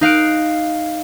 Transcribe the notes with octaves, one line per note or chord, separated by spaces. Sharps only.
D#4 F5 F#6 D7